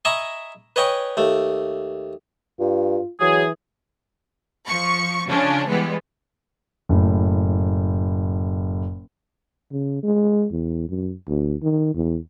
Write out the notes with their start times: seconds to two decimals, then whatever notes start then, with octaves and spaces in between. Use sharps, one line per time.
0.05 D#5 E5 G#5 A#5 B5 C#6
0.76 B4 C#5 D#5 G5 G#5 C#6
1.17 D#2 A3
2.59 G2 F4
3.20 E3 F#3 G#4
4.69 F3 C#6
5.28 C#3 F3 C#4 D4
5.68 E3 G3 G#3 B3
6.89 F#1 A2
9.72 C#3
10.03 G#3
10.51 E2
10.89 F#2
11.27 D2
11.62 D#3
11.94 E2